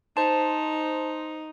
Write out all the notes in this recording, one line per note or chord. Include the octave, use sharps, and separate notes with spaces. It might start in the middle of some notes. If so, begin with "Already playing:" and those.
D#4 C5 A5 C6